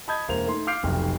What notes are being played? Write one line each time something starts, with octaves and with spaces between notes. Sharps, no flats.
D#5 A5 B5 D#6 G6 G#6
E1 A#3 C5 F7
A3 D#4 C6
F5 D6 F6 G6 C7 D7
F1 B1 F2